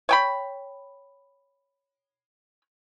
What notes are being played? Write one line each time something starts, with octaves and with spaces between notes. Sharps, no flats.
C#5 G5 B5